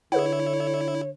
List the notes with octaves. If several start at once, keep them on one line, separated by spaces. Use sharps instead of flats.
D3 E4 G#4 B4 C#5 F#5